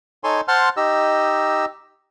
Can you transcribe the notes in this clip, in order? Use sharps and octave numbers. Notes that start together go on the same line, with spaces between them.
D#4 A4 C#5 G#5 C6
C5 F#5 A5 C6 F6
D#4 G4 D#5 E6